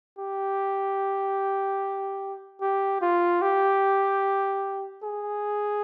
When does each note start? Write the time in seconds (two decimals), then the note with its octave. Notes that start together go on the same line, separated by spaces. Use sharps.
0.19 G4
2.61 G4
3.02 F4
3.42 G4
5.04 G#4